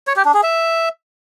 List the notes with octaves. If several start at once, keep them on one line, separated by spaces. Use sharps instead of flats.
C#5
G4
D4
G#4
E5